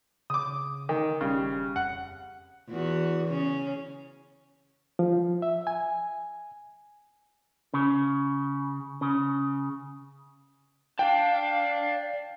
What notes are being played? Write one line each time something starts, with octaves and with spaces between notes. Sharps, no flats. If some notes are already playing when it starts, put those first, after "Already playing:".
C#3 D6 D#6
D#3
E1 C#3 G3
F2 F#5
E2 F#4
C#3 C#4
F3
E5
G#5
C#3
C#3
D5 F5 G5 A5